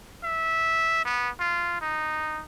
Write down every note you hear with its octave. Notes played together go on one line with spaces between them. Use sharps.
E5
B3
F4
D#4